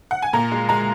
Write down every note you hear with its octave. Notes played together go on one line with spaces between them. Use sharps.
F#5
G#5
A#2 A#5
G#3
G#3 A#5